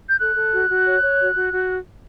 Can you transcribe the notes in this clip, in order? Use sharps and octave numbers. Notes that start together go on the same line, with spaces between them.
G6
A4 F#6
A4
F#4
F#4
C#5
C#5
F#4
F#4
F#4